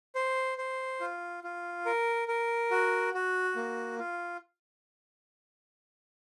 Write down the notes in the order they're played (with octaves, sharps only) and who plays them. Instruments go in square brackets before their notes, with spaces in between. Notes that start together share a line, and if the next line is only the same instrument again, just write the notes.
[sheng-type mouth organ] C5
C5
F4
F4
A#4
A#4
F#4
F#4
A#3
F4